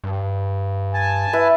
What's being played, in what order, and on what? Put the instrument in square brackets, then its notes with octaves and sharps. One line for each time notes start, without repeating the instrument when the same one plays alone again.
[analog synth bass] G2
[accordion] G#5 A5
[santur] E4 B4